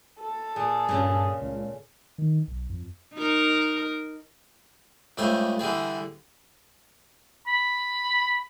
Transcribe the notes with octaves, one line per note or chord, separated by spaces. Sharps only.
A4
A#2 G#4
G2 A#2 C#3
C#2
D#3
B1
F2
D#4 A#4
C#2 G2 A3 C5 G#5
D3 E3 G3 G#4
B5